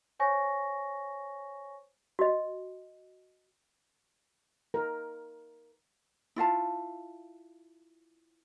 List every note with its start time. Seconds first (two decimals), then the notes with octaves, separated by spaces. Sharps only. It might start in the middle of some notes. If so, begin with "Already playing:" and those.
0.20 C5 C#5 G#5 C#6 A#6
2.19 F#4 D#5
4.74 A#4
6.36 E4 F4 F5 A5